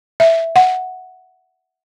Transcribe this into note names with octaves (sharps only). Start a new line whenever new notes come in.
E5
F#5